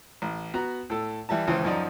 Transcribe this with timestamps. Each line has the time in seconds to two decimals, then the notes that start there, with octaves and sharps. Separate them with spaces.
0.22 A1
0.54 B3 F#4 A#5
0.90 A2 A4
1.29 E3 G3 E5 A5
1.47 G#1 C#2 E3 C5
1.65 F#2 F3 D#4 D5